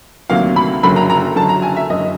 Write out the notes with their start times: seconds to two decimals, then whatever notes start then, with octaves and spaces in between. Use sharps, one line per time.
0.30 D2 C3 D#3 F#3 A#3 F5
0.56 B5
0.83 F#1 F#2 D3 F#3 B5
0.96 A#5
1.10 A#5
1.36 F#1 F#2 D3 F#3 A5
1.49 A#5
1.62 G#5
1.76 E5
1.89 F#1 F#2 D3 F#3 D#5